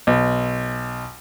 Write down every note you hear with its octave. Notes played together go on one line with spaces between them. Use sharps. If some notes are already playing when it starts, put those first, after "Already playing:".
B1